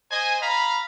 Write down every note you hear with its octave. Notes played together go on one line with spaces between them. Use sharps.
C5 D#5 G#5
F5 A#5 B5